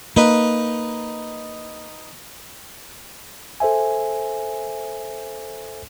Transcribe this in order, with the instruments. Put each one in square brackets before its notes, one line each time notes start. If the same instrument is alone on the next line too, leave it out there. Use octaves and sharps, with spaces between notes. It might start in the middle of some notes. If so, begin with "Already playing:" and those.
[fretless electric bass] A#3 [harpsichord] D#4 B4
[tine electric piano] A4 C5 E5 G#5